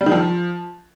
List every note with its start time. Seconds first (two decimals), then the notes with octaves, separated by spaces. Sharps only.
0.01 G3
0.06 D#3
0.12 F3